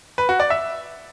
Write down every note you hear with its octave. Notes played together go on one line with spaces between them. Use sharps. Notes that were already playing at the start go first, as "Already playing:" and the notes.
B4
F#4
D5
E5